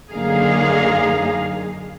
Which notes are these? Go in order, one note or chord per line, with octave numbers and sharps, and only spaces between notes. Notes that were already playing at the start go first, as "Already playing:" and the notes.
F#2 D3 A#3 D#4 G#4 F5